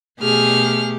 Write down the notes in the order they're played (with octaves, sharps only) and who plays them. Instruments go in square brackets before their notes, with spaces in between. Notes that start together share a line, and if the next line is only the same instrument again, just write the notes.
[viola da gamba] B2 A3 G4 [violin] G#4 F6